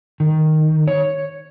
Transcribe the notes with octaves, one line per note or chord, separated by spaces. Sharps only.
D#3
C#5